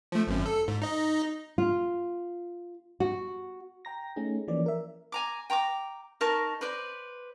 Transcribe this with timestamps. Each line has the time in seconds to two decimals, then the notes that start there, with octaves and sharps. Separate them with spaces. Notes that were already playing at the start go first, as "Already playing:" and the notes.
0.12 F3 A3
0.27 G#1 F#2
0.46 A4
0.68 G#2
0.82 D#4 D#5
1.58 F4
3.00 F#4
3.85 G5 A#5 A#6
4.16 A3 C#4 D#4 G#4
4.48 E3 F3 A#3 C#4 D5
4.66 A#4 E5
5.12 G#5 A#5 D6
5.50 G5 A#5 C#6 D6
6.21 D#4 A#4 A5 C#6
6.61 B4 C5 D5 B5